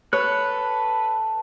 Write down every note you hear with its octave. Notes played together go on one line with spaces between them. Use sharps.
A4 B4 C#5 F#6